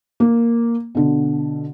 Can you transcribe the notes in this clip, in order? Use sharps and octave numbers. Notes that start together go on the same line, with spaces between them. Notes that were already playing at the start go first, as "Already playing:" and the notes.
A#3
B2 D3